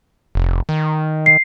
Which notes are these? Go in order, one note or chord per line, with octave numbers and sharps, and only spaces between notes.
F1
D#3
C7